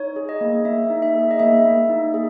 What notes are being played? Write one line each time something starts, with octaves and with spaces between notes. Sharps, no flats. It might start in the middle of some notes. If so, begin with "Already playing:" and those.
Already playing: D#4 C#5
G#4
D#5
A#3
A#3 E5
D#4
E5
G#4
D#5
A#3 E5
A#3
D#4
G#4